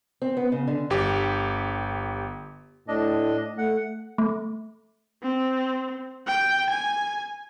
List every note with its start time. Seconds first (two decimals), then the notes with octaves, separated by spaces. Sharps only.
0.22 C4
0.37 B3
0.52 C#3
0.67 D3
0.90 G1 G4
2.88 A2 D4 D#5
3.58 A3 F#5
4.18 A3
5.23 C4
6.26 G5
6.69 G#5